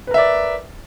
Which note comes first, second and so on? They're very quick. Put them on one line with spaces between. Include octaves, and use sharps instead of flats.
B4 A#4 E5 D5